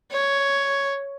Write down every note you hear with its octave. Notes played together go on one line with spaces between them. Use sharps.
C#5